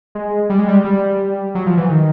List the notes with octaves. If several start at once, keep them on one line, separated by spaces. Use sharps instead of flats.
G#3
G3
G#3
G3
G3
F#3
F3
E3
D#3